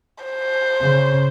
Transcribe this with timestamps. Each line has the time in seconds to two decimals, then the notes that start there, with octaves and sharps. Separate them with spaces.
0.25 C5
0.83 C#3